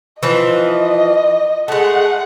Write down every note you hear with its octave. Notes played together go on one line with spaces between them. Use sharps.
E3 F3 C4 D#5
G#3 A3 F#5